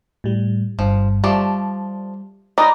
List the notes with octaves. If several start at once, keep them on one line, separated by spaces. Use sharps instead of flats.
A2 G3
G1 G2 F3
F3 G3 A3 D5
G#3 D#4 D5 B5 D#6 A#6